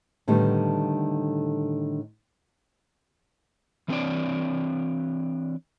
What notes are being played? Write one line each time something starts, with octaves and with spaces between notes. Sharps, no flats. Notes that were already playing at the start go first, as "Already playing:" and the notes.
A2 D3 D#3 G3 B3
E3 A3 C4 D4 C#5 D5